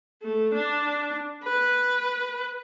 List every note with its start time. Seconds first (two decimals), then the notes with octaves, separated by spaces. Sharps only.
0.22 A3
0.54 D4
1.44 B4